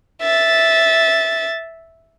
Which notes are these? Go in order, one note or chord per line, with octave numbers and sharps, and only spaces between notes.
E5 A6